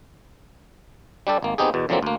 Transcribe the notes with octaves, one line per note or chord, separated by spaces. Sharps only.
G3 D4 G4 A4
G#1 A#3
B3 C4 D#4 G4 G#4
E2 B2
F2 D3 E3 F#3 A#3 C4
D2 A#3